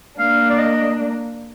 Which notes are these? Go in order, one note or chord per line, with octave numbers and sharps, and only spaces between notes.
A#3 D4 F5
D5
D#5